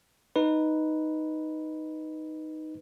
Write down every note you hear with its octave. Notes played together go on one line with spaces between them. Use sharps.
D#4 B4